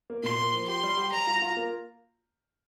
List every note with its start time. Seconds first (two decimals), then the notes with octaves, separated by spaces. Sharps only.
0.10 A#3
0.23 A#2 C6
0.39 A#3
0.53 F3
0.68 G4 C6
0.83 G3
0.97 G4
1.12 G3 A#5
1.27 F4
1.42 F4
1.57 A#3